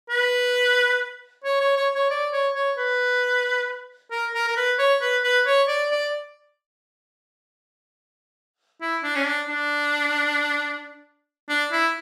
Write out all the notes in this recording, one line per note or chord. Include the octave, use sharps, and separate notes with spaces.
B4
C#5
C#5
C#5
C#5
D5
C#5
C#5
B4
A#4
A#4
A#4
B4
C#5
B4
B4
C#5
D5
D5
E4
D4
C#4
D4
D4
D4
E4